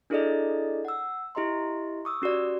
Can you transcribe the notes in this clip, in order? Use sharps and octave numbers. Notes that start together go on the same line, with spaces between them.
D4 E4 G#4 A4 D5 D#5
F#5 E6
E4 G4 D#5 A#5 C6
C#6 D#6 E6
C#4 F#4 G4 D5